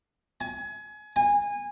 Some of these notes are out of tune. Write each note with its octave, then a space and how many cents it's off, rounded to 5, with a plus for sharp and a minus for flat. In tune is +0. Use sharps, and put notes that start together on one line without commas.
G#5 +30
G#5 -20